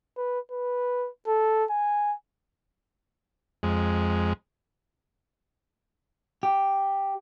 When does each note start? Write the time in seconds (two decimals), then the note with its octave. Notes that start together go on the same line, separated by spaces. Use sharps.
0.17 B4
0.51 B4
1.27 A4
1.70 G#5
3.63 F2 G#3
6.43 G4